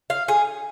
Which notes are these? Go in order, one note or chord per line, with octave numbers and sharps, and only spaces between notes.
F5
G#4